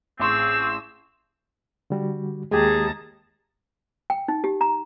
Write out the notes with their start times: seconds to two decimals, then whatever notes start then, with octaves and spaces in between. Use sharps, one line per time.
0.20 A1 C4 G#4 C6 C#6 E6
1.90 D3 G3 F#4
2.51 D#2 G#3 G4 G#4 A5 A#5
4.10 G5
4.28 D#4
4.44 G4
4.61 A#5